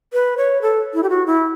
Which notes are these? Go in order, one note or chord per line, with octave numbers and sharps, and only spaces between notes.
B4
C#5
A4
E4
G4
F#4
E4